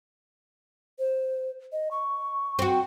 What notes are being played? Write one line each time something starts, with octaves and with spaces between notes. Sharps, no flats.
C5
D#5
C#6
C4 F#4